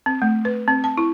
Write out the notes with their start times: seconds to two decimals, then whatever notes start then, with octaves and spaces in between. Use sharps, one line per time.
0.06 C4
0.22 A3
0.45 B4
0.68 C4
0.84 A5
0.98 E4